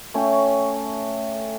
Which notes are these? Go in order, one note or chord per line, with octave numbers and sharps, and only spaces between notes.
A3 C#4 C#5 G5